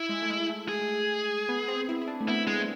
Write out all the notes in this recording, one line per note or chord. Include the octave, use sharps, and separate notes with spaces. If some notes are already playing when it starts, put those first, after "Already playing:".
Already playing: E4
G#3
A3
G#3
A3
G#4
B3
C4
E4
E4
D4
A3
B3 E4
G#3